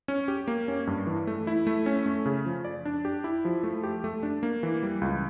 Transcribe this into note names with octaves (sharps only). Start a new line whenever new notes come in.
C#4
G4
A#3
C#4
G2
E3
A3
E4
A3
C#4
A3
C#3
F3
D5
D4
G4
E4
F3
A3
G4
A3
D4
A#3
E3
G3
C#2